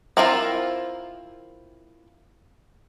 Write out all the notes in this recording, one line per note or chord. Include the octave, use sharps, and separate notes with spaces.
C4 E4 F4 A#4